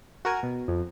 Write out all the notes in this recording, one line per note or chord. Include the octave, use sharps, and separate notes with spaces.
F#4 A#4 G#5
B2
F2